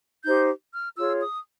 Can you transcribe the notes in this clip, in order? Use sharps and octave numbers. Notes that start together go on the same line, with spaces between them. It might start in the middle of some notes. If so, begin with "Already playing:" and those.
D#4 G4 C5 G6
F6
F4 G#4 C#5 E6
D#6